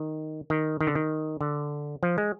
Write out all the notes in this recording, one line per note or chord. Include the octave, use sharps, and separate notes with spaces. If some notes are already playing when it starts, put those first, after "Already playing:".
Already playing: D#3
D#3
D#3
D3
D#3
D3
F3
G#3